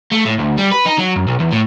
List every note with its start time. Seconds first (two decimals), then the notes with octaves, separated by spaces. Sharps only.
0.12 A3
0.26 A2
0.39 D2
0.59 G3
0.72 B4
0.86 D#4
0.99 F#3
1.16 F#2
1.27 B1
1.40 E2
1.52 A2